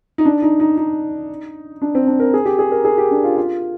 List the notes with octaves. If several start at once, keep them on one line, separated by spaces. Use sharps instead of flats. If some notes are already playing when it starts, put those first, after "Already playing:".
D#4
D4
D#4
D#4
D#4
D4
C4
D4
A#4
G#4
G4
G#4
A#4
G#4
G4
D4
F4
F4